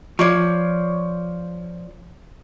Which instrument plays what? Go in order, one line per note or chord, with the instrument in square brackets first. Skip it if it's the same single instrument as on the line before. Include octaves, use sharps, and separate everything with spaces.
[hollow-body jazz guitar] F3 [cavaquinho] C#5 D5 C#6